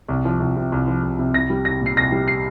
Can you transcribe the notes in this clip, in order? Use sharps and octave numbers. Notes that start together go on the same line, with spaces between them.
C2
F3
C2
C3
C2
F3
C2
C3
C2 A#6
G3
C2 A#6
A#2 C7
C2 A#6
G3
C7